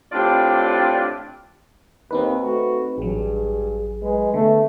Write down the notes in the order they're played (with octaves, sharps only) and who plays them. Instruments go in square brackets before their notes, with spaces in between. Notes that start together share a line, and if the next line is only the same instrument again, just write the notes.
[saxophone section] A2 C4 D4 F4 G4 D5
[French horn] D#2 [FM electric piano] C4 D#4 B4
[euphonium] A3 [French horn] F#4
[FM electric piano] A1 F#3 [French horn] G2 [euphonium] G#4
[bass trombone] G#3 [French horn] B4
[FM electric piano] D3 [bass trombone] A3 [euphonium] B3